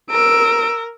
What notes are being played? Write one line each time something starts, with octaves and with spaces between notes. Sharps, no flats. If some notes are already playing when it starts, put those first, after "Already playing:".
A#4 E6 D7